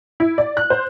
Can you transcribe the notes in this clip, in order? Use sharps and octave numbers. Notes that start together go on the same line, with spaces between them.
E4
D5
F#6
C5